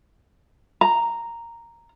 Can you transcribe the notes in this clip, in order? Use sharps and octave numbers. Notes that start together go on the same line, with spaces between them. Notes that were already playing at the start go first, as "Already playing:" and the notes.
A#5